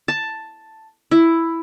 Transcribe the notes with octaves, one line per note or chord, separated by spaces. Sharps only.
A5
E4